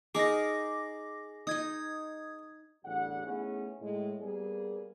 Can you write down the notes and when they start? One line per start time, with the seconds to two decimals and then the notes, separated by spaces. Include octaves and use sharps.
0.15 D#4 G#4 A#4 D6 A#6
1.47 D#4 D#5 D#6 G#6
2.85 A1 E2 D3 G3 F#5
3.26 A3 B3 C#4 D#4 E4 G#4
3.81 A2 G#3
4.21 G3 A#3 B3 G#4